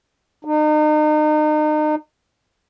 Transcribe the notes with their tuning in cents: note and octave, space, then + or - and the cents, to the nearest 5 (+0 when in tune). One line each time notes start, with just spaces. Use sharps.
D#4 -35